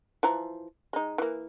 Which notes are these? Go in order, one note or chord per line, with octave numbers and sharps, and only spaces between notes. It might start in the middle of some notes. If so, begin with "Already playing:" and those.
E3 F3 A#5
G#3 D#4
E3 A#3